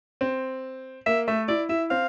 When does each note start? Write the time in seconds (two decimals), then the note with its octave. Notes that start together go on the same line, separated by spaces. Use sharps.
0.21 C4
1.06 A#3 E5
1.28 A3 E5
1.48 E4 D5
1.69 E4 E5
1.91 C4 F5